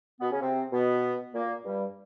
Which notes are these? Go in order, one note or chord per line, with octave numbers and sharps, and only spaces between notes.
B2 B3
C#3 C#4
C3 C4
B2 B3
A#2 A#3
G2 G3